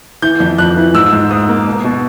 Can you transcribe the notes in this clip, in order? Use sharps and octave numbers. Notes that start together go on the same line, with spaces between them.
E3 G6
F2
F2 F#6
E3
G#2 E6
G#2
G#2 D#6
A#3
B2
B2